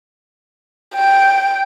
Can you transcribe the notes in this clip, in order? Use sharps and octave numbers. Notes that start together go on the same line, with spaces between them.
G5